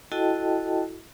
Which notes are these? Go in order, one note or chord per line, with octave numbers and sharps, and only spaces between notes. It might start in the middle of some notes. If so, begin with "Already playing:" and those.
E4 F#4 A4 D#5 G5 A5